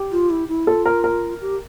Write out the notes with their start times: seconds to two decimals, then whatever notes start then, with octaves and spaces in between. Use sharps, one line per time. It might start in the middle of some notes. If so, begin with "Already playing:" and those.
Already playing: G4
0.12 F4
0.30 E4
0.49 E4
0.67 F4 A4
0.86 A#4
1.04 A#4
1.41 G4